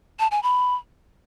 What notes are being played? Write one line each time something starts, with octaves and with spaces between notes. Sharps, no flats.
A5
G#5
B5